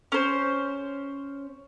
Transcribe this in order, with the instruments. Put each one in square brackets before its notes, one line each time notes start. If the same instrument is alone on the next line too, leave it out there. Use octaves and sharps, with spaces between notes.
[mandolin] C#4 C5